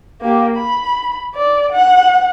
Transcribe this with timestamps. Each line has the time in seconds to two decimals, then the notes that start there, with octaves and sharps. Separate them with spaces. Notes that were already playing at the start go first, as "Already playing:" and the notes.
0.21 A#3 G4
0.57 B5
1.35 D5
1.72 F#5